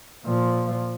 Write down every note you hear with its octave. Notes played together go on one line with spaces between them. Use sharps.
A#2 F3